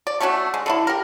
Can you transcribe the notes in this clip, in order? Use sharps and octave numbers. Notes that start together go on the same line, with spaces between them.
D5
A3 C#4 D4 F#4
G#3
D3 D4 E4
G4 A#4